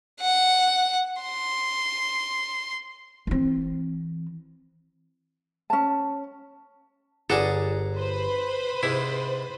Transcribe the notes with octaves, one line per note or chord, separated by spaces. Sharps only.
F#5
C6
E3 C4
C#4 A5
G1 G#4 A4 D5 F#5 G#5 A#5
B4 C5 B5
G#2 C3 E4